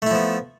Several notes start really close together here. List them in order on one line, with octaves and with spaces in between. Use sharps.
A3 E4 F3 B3